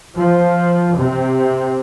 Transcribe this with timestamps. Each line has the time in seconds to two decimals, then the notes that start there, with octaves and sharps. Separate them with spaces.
0.18 F3
0.97 C3